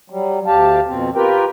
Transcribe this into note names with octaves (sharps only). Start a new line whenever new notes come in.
F#3 G3
D2 G4 F5 A5
F2 B2 C4
F4 G4 A#4 B4 G5